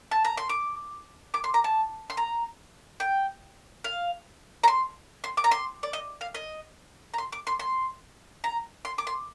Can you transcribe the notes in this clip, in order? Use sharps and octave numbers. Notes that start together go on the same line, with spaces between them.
A5
A#5
C6
D6
D6
C6
A#5
A5
C6
A#5
G5
F5
A#5
C6
C6
D6
A#5
C6
D5
D#5
F5
D#5
A#5
C6
D6
C6
C6
A#5
C6
D6
C6